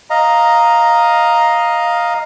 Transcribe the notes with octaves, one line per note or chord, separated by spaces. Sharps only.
D#5 F5 A#5